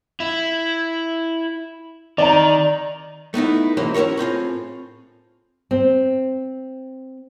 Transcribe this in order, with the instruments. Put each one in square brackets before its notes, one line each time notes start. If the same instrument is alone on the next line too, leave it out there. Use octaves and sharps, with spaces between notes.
[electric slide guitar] E4
[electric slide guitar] D#3 [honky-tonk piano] D5 A#5
[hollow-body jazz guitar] A3 B3 D#4 E4
E3 F#3 G#3 A#3 C#4 C5
C#4 E4 F#4 A#4 C#5
A2 C4 F4 G#4
[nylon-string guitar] C4